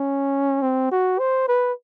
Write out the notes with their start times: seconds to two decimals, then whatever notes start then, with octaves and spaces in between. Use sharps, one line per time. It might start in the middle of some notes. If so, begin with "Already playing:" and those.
Already playing: C#4
0.62 C4
0.92 F#4
1.19 C5
1.48 B4